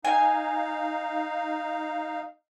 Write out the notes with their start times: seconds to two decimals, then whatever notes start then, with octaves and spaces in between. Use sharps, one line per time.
0.05 D#4 F5 G#5